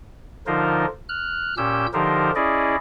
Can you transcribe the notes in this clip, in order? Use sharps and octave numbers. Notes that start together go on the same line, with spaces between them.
D3 F3 D#4 F4 A#4 C5
F6 F#6
A#2 C#4 G4 E6 G6
D3 F3 D#4 G4 A#4 C5
C#4 E4 G#4 D5 D#5